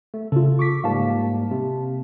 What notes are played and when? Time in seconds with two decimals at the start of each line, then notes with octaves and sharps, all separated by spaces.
0.14 A3
0.32 C#3 F4 A4
0.59 C#6 D6 B6
0.84 G#2 G3 A#3 F5 A5
1.51 C3